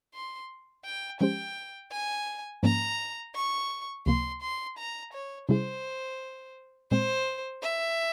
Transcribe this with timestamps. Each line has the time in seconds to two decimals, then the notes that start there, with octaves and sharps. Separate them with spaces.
0.14 C6
0.85 G5
1.20 F3 G#3 C#4 G4 C5 G5
1.92 G#5
2.63 G#2 F3 A#3 C#4 A#5
3.35 C#6
4.06 C#2 C3 F3 A#3 C6
4.42 C6
4.78 A#5
5.13 C#5
5.49 C3 G3 C#4 E4 G#4 C5
6.91 A#2 G#3 C4 C5
7.63 E5